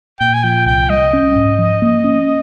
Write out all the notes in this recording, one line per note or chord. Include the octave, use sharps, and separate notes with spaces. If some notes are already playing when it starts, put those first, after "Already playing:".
A#2 G5
G#5
F3 G5
C2 G5
G3 D#5
C#4
G#2
F3
A#3
C#4